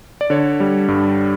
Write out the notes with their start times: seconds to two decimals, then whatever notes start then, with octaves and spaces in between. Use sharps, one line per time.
0.21 D5
0.30 D3 C#5
0.60 G3
0.88 G2